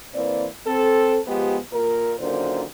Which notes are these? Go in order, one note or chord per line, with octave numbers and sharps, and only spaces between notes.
E3 A#3 C4 B4 D5
C4 A4
F3 G#3 B3 G4
A#2 A#4
F#2 A#2 D3 D#3 C5